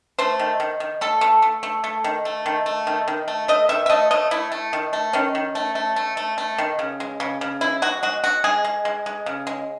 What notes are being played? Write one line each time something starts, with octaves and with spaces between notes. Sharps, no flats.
A3 C5
D#3
D#3
D#3
A3 A4
A3
A3
A3
A3
D#3
A3
D#3
A3
D#3
D#3
A3
A3 D#5
D#3 E5
E5
A3 D#5
A3 D#5
A3 E4
A3
D#3
A3
D#3 C#4
D#3
A3
A3
A3
A3
A3
D#3
C#3
G#3
C#3
C#3
G#3 E4
G#3 F#4
G#3 F#4
G#3 F#4
G#3 G#4
G#3
G#3
G#3
C#3
G#3